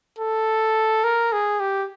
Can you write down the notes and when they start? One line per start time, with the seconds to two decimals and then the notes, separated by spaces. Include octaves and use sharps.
0.19 A4
1.04 A#4
1.32 G#4
1.60 G4